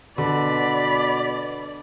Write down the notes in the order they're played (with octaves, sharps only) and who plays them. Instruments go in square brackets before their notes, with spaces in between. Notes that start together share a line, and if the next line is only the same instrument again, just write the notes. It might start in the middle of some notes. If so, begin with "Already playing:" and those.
[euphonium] B2 [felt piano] D3 [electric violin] D5 [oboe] B5